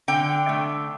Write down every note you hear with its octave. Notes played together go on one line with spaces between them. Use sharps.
D3 G5
A3